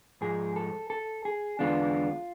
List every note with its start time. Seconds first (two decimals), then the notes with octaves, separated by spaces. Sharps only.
0.21 G#2 F3 G#3 G#4
0.56 A4
0.90 A4
1.25 G#4
1.59 E2 D3 G#3 B3 D4 F4